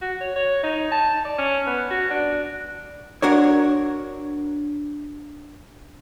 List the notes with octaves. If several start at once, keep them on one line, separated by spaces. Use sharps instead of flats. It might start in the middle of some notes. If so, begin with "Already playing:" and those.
F#4
C#5
C#5
D#4
A5
D5
C#4
B3
F#4
D4
D4 F#4 A#4 C#5